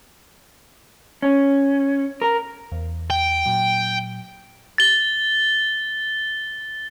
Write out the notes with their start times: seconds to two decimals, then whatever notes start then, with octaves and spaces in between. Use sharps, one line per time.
1.22 C#4
2.22 A#4
2.72 E2
3.10 G5
3.46 A#2 F#3
4.78 A6 G7